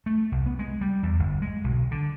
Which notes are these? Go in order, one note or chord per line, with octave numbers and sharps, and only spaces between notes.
A3
C2
B3
G#3
G3
E2
G1
G#3
B1
D3